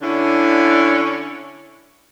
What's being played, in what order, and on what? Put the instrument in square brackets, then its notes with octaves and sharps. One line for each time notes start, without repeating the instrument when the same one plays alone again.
[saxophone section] D3 C#4 D4 E4